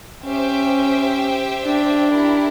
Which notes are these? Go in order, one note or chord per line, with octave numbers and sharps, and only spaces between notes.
C#4 G4 C5 E5 G5
D4
E4 G4 A#4